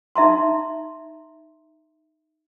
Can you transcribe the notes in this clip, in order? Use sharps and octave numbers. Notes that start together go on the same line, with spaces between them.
D#4 E5 A#5 C6